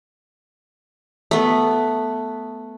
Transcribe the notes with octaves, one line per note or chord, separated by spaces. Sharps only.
A3 B3